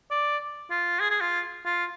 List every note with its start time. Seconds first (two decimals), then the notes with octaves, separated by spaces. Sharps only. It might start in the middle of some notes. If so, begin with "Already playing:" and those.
0.11 D5
0.70 F4
1.00 G#4
1.10 G#4
1.21 F4
1.65 F4